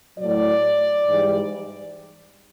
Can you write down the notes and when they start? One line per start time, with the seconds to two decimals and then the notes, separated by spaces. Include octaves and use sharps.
0.18 A2 F#3 D5
1.08 G#2 E3 G3